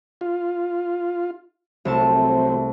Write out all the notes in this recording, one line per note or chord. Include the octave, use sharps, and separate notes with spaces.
F4
C2 F#3 A3 C4 A5